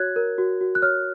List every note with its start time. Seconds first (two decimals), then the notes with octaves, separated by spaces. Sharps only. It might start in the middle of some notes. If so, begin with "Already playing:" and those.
Already playing: F#4 C#5 F#6 G#6
0.16 A#4
0.38 F#4
0.61 F#4
0.75 F#6
0.82 C#5 F6